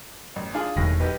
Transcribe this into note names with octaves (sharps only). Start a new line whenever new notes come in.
A1
D4 F4 G#4
E1 D#2 A2 A#6
B1 B3 G4